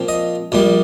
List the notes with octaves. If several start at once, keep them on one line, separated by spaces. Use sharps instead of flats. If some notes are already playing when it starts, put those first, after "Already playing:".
Already playing: A#2 F3 C4
D#5
A#1 A#2 G3